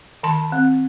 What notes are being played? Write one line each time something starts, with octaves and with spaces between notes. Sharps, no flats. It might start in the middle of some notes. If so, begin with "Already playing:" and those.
D#3 A5 C6
C4